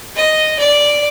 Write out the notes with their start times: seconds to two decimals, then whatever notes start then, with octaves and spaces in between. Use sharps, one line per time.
0.16 D#5
0.59 D5